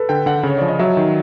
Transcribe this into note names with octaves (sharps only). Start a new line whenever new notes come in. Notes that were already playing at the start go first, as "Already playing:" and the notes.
Already playing: A4 B4
D3 G5
D3 F#5
C#3 C#5
F3 D5
D#5
F#3 E5
D#3